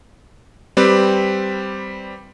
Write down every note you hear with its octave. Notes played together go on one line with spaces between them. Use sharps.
G3 C4 G4 B4